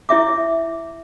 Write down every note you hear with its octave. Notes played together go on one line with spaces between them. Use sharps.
E4 C#5 E5 D6